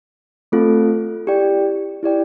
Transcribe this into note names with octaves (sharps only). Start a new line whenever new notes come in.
A3 C4 F4 A4
E4 G4 D5 G5
E4 G4 D5 G5